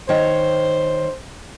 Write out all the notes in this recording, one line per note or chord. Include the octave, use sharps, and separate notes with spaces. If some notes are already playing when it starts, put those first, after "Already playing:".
D#3 C5 C#5 G5